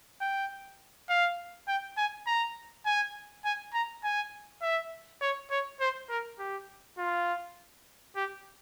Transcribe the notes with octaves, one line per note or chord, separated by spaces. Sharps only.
G5
F5
G5
G#5
A#5
G#5
G#5
A#5
G#5
E5
C#5
C#5
C5
A#4
G4
F4
G4